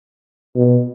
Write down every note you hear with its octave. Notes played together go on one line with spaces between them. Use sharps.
B2